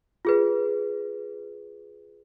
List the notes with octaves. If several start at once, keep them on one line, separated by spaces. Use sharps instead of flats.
F4 G#4 B4